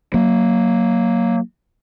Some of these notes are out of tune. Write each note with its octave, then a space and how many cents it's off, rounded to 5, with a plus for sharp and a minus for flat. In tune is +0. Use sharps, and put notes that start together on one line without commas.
F#3 +0 A#3 +0